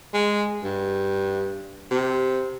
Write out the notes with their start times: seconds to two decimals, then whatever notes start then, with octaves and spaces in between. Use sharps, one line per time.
0.14 G#3
0.64 G2
1.91 C3